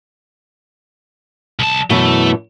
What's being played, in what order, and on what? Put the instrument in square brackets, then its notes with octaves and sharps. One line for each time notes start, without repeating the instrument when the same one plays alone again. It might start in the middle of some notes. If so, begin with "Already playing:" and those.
[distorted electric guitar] C2 A5
[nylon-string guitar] F#2 B2 E3 [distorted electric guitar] A3